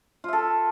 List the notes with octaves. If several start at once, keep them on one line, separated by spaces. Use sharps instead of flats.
F4 A4 E5